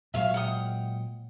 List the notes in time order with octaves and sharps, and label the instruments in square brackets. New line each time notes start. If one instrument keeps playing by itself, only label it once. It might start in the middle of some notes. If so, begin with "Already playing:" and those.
[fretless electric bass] A#2 F#3 G#3 [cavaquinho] E5 F5 C#6
[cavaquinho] F#5 G5 D#6